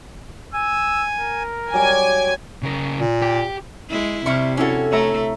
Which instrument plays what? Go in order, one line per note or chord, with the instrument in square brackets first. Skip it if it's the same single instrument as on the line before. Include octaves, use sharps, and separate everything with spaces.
[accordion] G#5 [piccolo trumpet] E6
[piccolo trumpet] A#4
[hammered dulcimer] F#3 G3 [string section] G#5 [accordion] D6
[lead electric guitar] C#3 A#4
[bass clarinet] A#2
[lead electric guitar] G4
[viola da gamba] G#3 E4
[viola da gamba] C3 [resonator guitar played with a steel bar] G3 E4 [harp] C#6 F6
[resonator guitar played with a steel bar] C#4 F#4 [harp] D4 E4 A4
[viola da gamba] A3 [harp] C#5 E5 A#5